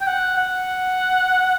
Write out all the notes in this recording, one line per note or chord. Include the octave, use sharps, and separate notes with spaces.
G5
F#5
F#5